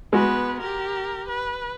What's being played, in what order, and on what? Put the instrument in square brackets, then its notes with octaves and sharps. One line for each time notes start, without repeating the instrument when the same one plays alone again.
[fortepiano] G#3 F#4 [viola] B3 B4
[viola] G4 A#4
B4